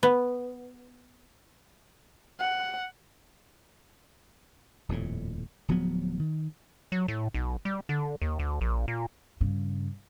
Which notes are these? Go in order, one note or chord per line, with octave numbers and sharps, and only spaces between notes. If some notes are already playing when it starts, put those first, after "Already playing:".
B3
F#5
D#1 F2 A2
D1 F3 F#3 B3
D#3
F#3
A2
B1
G3
D3
D#2
D2
A#1
A#2
G2 C#3